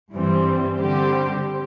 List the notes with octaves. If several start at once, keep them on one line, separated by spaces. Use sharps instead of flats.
G2 E3 G3 C4
D3 G3 C4 G4